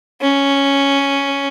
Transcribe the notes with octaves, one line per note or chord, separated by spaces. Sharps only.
C#4